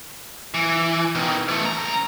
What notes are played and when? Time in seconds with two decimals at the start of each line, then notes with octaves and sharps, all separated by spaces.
0.54 E3
1.15 B2 D#3
1.48 E3 A3
1.64 C#2 A#5